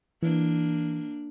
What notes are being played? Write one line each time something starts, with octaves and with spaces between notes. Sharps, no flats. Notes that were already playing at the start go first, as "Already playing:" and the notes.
E3 A#3 D4